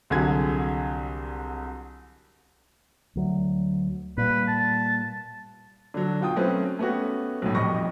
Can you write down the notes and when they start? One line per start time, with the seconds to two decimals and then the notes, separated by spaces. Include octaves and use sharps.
0.10 C2 D3 F#3 G#4 G#6
3.16 D2 F#3
4.17 A#2 G3 B4
4.47 A5
5.94 D3 F#3
6.21 B2 F4 G5 D#6
6.36 F#3 A3 C4 C#4 B4
6.79 A3 B3 C#4 F#4 G4
7.42 B1 A2
7.55 D#1 F2 D#5 B5 C#6 A#6